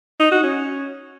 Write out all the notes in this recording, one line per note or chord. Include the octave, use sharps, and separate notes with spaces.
D#4
F#4
C#4